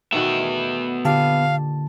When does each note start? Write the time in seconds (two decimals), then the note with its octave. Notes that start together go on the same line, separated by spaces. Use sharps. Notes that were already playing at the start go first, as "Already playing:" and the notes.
0.13 B2 D#3 A3 B3 E5
1.05 A#2 D3 G4 F5 A5